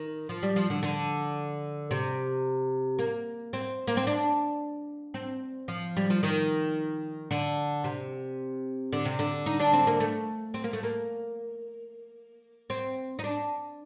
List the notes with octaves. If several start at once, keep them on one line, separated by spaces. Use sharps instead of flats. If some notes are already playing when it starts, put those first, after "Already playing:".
Already playing: D#3
F3
G3
F3
D3
D3
C3
A#3
C4
A#3
C4
D4
C4
F3
G3
F3
D#3
D3
C3
D3
C3
D3
D#4
D4
C4
A#3
A3
C4
A#3
A3
A#3
C4
D#4
D4